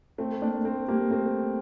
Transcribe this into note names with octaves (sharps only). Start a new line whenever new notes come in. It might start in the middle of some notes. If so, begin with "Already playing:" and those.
A3 C4
A#3 D4
A3 C4
G3 A#3
A3 C4